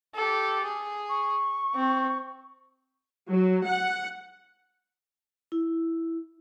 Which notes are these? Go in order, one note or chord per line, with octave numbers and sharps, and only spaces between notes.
G4 A4
G#4
C#6
C4
F#3
F#5
E4